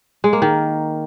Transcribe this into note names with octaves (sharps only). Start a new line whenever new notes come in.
G#3
A#3
D#3